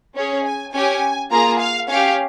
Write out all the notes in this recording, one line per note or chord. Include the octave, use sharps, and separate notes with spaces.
C#4 G#4 C#5
G#5
C#4 G4 G#5
A#3 F4 G#4 A#5
F5
C#4 G4 F5